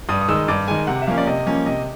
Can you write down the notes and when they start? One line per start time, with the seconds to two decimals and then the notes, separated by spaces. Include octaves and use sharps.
0.09 G2 D#6
0.21 D#6
0.28 D#3 G#3 E6
0.48 G2 D6
0.68 D#3 G#3 G#5
0.87 C3 F#5
1.02 E5
1.07 F3 A#3 C#4 F5
1.18 D5
1.27 C3 D#5
1.46 F3 A#3 C#4
1.66 C3 D#5